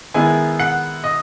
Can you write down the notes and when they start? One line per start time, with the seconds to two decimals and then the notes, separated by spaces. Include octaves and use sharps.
0.14 D#3 G#3 B3 E4 G#5
0.59 F#5
1.04 D#5